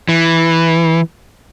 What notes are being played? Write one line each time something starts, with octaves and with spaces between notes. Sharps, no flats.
E3